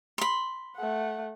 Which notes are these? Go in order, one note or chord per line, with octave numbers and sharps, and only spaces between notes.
B5 C6
A3 F#5